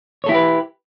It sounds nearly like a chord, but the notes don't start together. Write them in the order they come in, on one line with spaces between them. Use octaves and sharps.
C#5 A4 E4 G4 B4